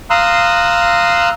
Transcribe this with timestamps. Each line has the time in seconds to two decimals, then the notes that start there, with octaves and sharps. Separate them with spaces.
0.10 F5 A#5 C6 D#6 E6 F#6